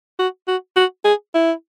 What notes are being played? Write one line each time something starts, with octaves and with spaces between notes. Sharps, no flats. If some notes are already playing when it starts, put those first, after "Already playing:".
F#4
F#4
F#4
G#4
E4